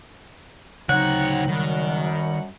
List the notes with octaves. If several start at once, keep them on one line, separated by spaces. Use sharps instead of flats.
D2 C#3 F#3 C4 D#4 C#5 F#5
F#2 D#3 G3